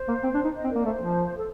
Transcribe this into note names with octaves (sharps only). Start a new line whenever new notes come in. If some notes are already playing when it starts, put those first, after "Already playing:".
Already playing: C5
A#3
C4
D4
D#4
C5 D#5
C4
A#4 D5
A#3
A3 C5
F3
A4